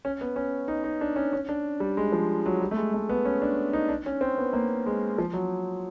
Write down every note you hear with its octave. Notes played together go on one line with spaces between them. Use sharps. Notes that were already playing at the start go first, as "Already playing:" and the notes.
C#4
B3
C#4
D#4
D#4
D4
C#4
C#4
D4
G3
G#3
F3
F#3
G3
A3
G#3
A3
B3
C#4
D4
D#4
D4
C#4
C4
B3
A#3
G#3
F3
F#3